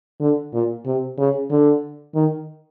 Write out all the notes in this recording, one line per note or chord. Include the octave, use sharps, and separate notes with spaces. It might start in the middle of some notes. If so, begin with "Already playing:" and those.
D3
A#2
C3
C#3
D3
D#3